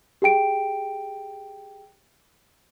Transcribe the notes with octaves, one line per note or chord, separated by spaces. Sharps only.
G4 G#4 G5 D7